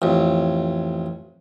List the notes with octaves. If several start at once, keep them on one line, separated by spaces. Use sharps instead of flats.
A1 F2